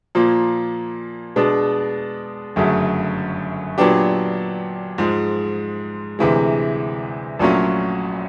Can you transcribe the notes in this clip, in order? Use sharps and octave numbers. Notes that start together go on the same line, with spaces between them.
A#2 F3 A#3
B2 G#3 B3 D4
G1 F#2 C#3 F#3 A3
A#2 F#3 B3 D4 G4
G#2 F3 G#3
D2 C3 E3 G#3
A#1 A#2 F#3 A3 C#4